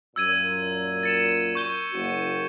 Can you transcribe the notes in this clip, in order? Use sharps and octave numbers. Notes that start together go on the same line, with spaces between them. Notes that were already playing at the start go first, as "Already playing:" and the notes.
F#2 A#2 E6 G#6 D#7
A6 C#7 E7
C#6 G6 G7
F#1 F#4